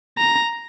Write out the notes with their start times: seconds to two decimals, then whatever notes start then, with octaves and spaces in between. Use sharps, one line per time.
0.18 A#5